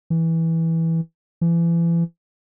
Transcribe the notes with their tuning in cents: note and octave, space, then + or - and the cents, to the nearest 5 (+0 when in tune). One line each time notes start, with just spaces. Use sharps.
E3 -10
E3 +35